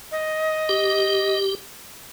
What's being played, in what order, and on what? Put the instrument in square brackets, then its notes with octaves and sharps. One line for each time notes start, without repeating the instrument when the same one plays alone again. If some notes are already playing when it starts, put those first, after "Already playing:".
[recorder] D#5
[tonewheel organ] G4